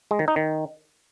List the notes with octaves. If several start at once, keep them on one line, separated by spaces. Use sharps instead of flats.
G#3
D#3
D#4
D#3